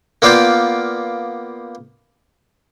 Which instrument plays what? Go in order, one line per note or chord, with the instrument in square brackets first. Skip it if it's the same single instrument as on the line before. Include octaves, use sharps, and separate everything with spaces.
[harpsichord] A#3 B3 F4 D5 F5 G5